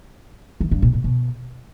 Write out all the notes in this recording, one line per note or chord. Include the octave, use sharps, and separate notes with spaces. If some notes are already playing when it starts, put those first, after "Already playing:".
E3
G2
A#2
A#2
B2